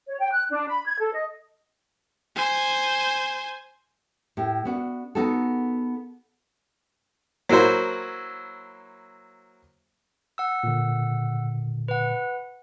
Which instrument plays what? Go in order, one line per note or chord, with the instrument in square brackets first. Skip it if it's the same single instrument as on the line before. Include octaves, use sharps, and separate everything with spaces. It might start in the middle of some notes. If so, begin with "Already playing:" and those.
[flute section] C#5
G5
F#6
D4
B5
G#6
A4
D#5
[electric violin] C5 G#5
[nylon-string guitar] A2 G4
B3 D4 F#4
B3 D#4 F#4 G#4 A4
[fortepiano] F#3 A#3 E4 F#4 C5
[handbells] F#5 E6
[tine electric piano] A#2 D3
[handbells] B4 F#5